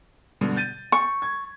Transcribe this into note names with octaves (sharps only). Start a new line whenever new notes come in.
G2 B2 D3
G6 A6 D#7
C#6
G#6